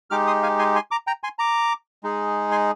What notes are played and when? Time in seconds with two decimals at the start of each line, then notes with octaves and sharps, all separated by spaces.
0.10 G#3 D#4 G4 D6 F6
0.27 C6 D#6
0.43 F5 G#5
0.59 G#5 C6
0.75 G#5 C6
0.91 A#5 D6
1.07 G5 A#5
1.24 G#5 C6
1.39 A#5 D6
2.04 G#3 D#4 G#4
2.51 G#5 C6